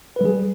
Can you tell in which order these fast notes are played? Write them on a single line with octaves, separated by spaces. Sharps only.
B4 G3 G#4